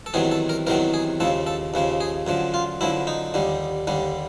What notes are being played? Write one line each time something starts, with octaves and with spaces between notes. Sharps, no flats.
A4
E2 C3 D#3 F#3 G#4
A4
A#4
E2 C3 D#3 F#3 A#4
G#4
D#2 C#3 F3 A4
A4
D#2 C#3 F3
G#4
F#2 D3 F3
F4
F#2 D3 F3 E4
D#4
D#2 D3 G3
D#2 D3 G3